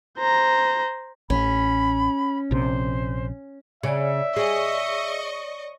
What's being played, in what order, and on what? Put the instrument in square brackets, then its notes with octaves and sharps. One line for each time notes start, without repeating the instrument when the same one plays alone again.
[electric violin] C5 A#5
[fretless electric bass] A1 [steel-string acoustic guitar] C#4 [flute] B5
[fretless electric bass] A#1 C3 [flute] C5
[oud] C#3 [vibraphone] C#5 D5 [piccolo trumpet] E5
[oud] G#4 [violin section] D#5 C#6